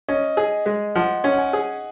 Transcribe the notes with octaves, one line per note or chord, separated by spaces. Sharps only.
C#4 D#5
G#4
G#3
F3 F#5
C#4
F#5
G#5
G#4